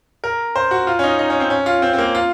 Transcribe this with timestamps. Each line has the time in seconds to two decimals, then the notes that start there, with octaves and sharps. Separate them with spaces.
0.24 A#4
0.56 C5
0.71 F#4
0.87 F4
0.99 C#4
1.04 D#4
1.19 D#4
1.30 C#4
1.40 C4
1.50 C#4
1.66 F4
1.82 C4
1.93 C4
1.98 A#3
2.15 F4